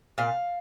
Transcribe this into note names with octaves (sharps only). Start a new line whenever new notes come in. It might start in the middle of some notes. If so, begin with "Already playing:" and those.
A#2 F5